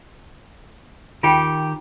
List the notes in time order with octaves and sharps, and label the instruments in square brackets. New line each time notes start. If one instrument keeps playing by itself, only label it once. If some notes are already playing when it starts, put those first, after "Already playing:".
[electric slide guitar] D#3 G4 [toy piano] F4 G5